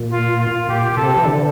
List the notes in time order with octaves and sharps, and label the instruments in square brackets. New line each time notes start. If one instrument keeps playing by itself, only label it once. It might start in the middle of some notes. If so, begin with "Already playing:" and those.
Already playing: [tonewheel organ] A#2
[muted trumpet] F4
F4
[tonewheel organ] A#2 [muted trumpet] G4
[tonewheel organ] C3 [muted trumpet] A4
[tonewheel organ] E3
D3